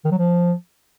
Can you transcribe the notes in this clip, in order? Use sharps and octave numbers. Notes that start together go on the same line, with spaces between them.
D#3
F#3
F3